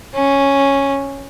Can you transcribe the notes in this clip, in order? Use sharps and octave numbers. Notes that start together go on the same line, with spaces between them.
C#4